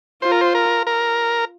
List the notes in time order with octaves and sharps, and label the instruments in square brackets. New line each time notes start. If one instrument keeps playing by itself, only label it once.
[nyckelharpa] F4 [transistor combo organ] C5
[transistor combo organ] A#4
C5
A#4
A#4